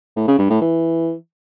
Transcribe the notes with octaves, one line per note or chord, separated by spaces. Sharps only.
A2
C#3
G2
A2
E3